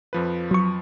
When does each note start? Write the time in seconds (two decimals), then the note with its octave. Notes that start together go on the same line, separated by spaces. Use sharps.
0.13 F2 F3 B4
0.51 F#3 C#6